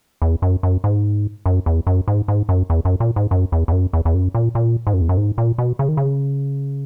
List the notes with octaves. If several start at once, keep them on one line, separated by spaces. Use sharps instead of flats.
E2
F#2
F#2
G#2
F#2
E2
F#2
G#2
G#2
F#2
E2
F#2
A#2
G#2
F#2
E2
E2
F#2
E2
E2
F#2
A#2
A#2
G#2
F#2
E2
F#2
G#2
A#2
B2
C#3
D#3
C#3